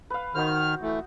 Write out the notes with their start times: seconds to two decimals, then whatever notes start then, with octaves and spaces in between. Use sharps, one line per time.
0.10 B4 F5
0.35 D#3 D#4 F#4 C5 F6
0.82 E3 A3